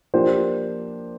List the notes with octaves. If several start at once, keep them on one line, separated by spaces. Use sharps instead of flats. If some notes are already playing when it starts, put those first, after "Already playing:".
F3 A#3 D4 G4 C5